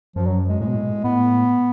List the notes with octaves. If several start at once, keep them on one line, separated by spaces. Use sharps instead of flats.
F#2 F3
F#3
G#3
A2 G#3
B2
A2
B2
A2
A2 B3